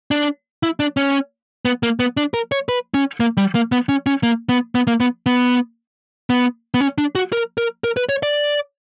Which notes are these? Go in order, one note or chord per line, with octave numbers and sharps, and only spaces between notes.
D4
E4
D4
C#4
B3
A#3
B3
D4
A#4
C#5
B4
C#4
A#3
G3
A#3
B3
C#4
C#4
A#3
B3
B3
A#3
B3
B3
B3
B3
C#4
D4
F#4
A#4
A#4
A#4
B4
C#5
D5